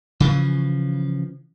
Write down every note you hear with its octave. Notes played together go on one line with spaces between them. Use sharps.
C#3 E3 F3